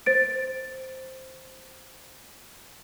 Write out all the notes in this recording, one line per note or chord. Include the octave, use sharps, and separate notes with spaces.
C5 A6 D7